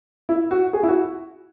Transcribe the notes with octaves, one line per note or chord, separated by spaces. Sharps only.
E4
F#4
G#4
E4
F#4